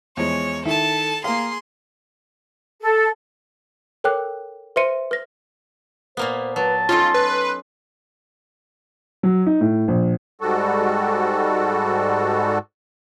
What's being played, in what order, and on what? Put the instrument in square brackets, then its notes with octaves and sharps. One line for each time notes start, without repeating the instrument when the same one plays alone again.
[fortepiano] E2 F3 G#3 [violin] C#5
[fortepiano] D#3 E4 [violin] A4 A5
[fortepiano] A#3 A#4 F5 [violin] G#4 C6
[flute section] A4
[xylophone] A4 A#4 C#5 G5 D6 F#6
B4 C5 E5 C6 C#7 D#7
B4 A#6
[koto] A#2 A#3 B3 [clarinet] C5
[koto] F#3 [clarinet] B4 [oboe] A5
[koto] C#4 D#4 A4 [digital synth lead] F4 [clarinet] C6
[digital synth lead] B4
[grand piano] F#3
D#4
A2
A#1
[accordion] G#2 G3 F#4 A4